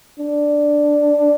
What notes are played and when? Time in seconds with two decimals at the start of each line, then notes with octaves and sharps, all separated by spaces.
0.19 D4